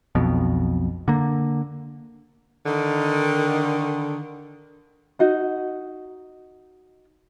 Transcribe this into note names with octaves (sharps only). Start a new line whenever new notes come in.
B1 F2 B2
D3 A#3
D3 D#3
D#4 F#4 D#5